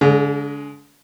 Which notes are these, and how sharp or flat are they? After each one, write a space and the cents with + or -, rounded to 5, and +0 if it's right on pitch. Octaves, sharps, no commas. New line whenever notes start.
D3 -35 G#3 +15